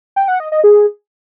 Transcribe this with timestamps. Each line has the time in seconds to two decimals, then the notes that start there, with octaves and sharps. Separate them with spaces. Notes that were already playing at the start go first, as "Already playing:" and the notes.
0.16 G5
0.28 F#5
0.40 D#5
0.52 D#5
0.64 G#4